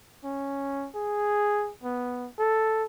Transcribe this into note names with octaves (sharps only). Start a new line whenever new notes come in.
C#4
G#4
B3
A4